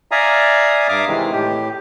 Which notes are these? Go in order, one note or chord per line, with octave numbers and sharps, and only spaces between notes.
D5 E5 F5 G#5 A#5 D#6
G2 E5 F5 D6 D#6 F6
C3 D#3 E3 G#3
A2 G4